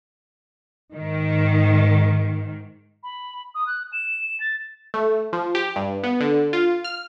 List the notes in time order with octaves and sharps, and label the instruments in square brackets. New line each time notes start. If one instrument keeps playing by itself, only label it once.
[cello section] G#2 D#3
[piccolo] B5
D#6
F#6
E7
A6
[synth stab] A3
F3
G4
G2
B3
D3
F4
F6